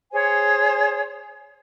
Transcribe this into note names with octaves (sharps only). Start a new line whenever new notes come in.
G#4 C5 C#5 G#5